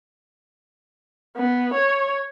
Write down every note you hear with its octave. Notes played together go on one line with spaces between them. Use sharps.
B3
C#5